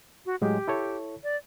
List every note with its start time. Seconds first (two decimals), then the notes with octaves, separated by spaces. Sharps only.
0.26 F#4
0.41 A2 F#3 G#3 G4
0.68 E4 A4 C#5
1.24 D5